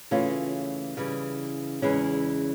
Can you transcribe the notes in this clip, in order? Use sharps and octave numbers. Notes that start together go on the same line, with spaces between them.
C#3 E3 A3 C#4 F4
C#3 E3 G3
E2 C#3 E3 G#3 C#4